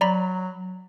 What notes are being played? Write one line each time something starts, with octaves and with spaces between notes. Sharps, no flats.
F#3 D5 A#5 B5